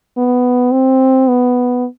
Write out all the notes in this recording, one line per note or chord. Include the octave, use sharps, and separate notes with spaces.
B3
C4
B3